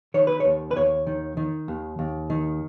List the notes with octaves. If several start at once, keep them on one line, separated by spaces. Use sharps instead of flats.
D#3 C#5
B4
D#2 C#5
B4
D#2 C#5
D#3
D#3
D#2
D#2
D#3